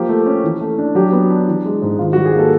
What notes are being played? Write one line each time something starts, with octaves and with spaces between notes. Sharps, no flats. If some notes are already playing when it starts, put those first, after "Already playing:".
Already playing: F3 A#3 G4
A3
C#4
E3
A3
D4
F#3 G4
B3
D4
E3
G#3
G#2
D#3 F4
F#4
G3
G#4
A#3 A4